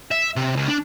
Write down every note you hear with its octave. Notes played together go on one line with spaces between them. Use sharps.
E5
C3
C#2
D4